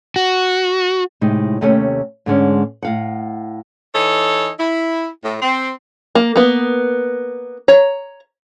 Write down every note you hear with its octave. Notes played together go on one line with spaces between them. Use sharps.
F#4
A2 C3 G#3 D#4
D#2 C3 A3 C#4 C#5
G#2 D3 G#3 C#4
A2 F5 F#5
E3 D#4 A4 C#5
E4
A2
C4
A#3
A#3 B3
C#5 A#5